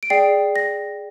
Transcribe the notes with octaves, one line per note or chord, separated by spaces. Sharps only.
D7
G#4 D5 G5 C7
A#6